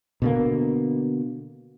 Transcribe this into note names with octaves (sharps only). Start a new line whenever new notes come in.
B2 D3 A#3